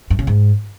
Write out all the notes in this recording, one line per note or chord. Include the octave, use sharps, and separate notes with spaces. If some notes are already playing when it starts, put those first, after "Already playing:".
G2
C#3
G#2